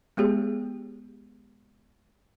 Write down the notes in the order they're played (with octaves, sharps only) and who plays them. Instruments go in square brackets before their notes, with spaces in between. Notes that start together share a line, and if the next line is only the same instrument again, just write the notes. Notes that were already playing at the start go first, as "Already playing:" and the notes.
[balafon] G#3 B3 G4 G#4